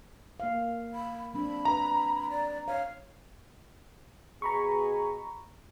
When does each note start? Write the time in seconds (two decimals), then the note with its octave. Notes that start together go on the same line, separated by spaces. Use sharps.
0.40 A#3 F5
0.94 B5
1.34 F#3 C4 D4 B5
1.65 D4 B4 A#5
2.30 D5
2.68 C#5 F5
4.42 B2 G#4 A#5 B5 C#6